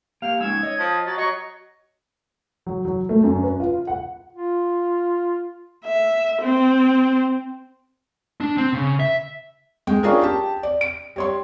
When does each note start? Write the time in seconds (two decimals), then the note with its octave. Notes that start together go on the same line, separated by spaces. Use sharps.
0.22 A#3 G4 F5 F7
0.40 G#3 C#4 D#4 E6 G#6
0.63 C#5 D#5
0.79 F3
1.06 F#3 A6
1.18 F#3 D#5 C#6
2.66 F#3
2.85 F#3
3.09 A3
3.24 F#2
3.43 B4
3.60 F4
3.87 F#5
4.33 F4
5.85 E5
6.42 C4
8.41 D4
8.57 C4
8.73 C#3
9.00 E5
9.87 G#3 G5
10.03 C#4 D4 F4 G#4 A#4
10.21 G4 A5
10.63 D5
10.81 D7
11.16 G3 C#5 C6